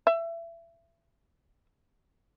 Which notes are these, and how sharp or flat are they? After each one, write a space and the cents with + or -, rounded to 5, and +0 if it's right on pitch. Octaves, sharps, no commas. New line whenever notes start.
E5 +30